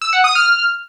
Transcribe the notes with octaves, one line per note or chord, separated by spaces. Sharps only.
E6
F#5
D#6
F6